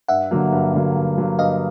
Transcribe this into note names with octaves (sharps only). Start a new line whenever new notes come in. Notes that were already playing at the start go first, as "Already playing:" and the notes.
G2 E5 F#5
D3 F#3 A#3
G2
D3 F#3 A#3
G2
D3 F#3 A#3
G2 D#5 F5